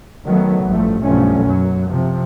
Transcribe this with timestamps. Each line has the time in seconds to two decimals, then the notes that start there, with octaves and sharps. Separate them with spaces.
0.26 D#3 F#3 A3 B3
0.65 A1 G2 F3 A3
1.03 B1 G2 E3 F3 A3 C#4
1.45 F#2 F#3
1.89 C3 F3